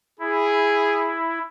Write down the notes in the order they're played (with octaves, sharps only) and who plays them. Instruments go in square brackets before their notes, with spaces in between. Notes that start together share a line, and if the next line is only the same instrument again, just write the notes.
[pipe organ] E4 [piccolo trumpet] G#4